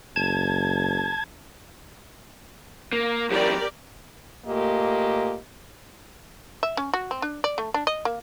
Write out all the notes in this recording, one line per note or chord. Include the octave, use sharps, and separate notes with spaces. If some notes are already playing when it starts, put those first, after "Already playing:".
F#1 A5 G#6
A#3
F#2 E3 G4 A#4 D5
A#2 A3 A#3 G4 D#5
E5
C#4
F#4
C4
D4
D5
A3
D4
D#5
A#3